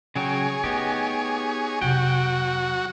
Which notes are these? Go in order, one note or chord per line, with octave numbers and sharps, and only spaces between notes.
C#3 F#3 G#4 C#5 G5
A3 B3 D#4 G4
F2 C3 F#3 F#4 G5